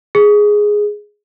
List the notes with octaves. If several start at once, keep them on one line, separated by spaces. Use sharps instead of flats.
G#4